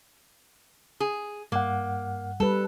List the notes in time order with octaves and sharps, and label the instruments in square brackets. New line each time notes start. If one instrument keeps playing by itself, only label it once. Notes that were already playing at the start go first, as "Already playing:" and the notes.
[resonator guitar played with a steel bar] G#4
[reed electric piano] G2 F#5 [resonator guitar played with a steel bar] A#3
[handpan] G3 B4 [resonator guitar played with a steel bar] A4